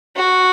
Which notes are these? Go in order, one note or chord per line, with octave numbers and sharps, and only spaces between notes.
F#4